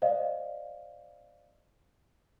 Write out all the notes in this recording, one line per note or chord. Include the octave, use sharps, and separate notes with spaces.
C5 D5 D#5 F5